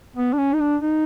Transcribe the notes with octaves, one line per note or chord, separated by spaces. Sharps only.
B3
D4
C#4
D#4
D4
D#4